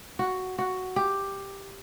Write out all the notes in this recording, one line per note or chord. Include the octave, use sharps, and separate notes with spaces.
F#4
F#4
G4